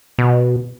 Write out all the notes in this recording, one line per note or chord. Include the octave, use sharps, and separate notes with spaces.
B2